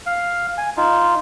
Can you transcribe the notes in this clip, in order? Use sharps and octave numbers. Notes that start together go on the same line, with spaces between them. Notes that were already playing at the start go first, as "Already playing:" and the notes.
F5
G#5
D#4 F4